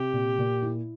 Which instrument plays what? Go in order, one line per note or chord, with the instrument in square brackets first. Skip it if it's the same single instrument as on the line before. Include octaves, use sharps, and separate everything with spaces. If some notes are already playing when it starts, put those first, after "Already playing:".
Already playing: [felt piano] C3 [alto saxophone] G4
[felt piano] A#2
A#2
E4